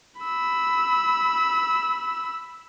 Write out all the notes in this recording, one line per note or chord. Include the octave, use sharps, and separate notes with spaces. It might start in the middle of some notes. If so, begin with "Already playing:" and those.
B5 E6